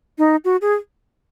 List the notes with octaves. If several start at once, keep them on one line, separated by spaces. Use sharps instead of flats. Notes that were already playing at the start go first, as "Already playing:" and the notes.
D#4
F#4
G#4